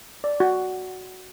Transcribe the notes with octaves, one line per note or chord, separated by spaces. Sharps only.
D5
F#4